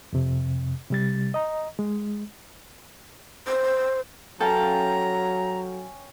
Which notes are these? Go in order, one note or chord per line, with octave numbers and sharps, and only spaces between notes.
F2 C3
C3 G3 A6
D#5 A#5
G#3
C5
F#3 C#4 A4 F5 G5 A#5